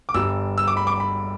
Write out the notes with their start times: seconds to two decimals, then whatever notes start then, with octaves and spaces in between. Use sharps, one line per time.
0.09 D6
0.14 G1 G2 G3 E6
0.58 E6
0.67 D6
0.77 B5
0.87 D6
1.00 B5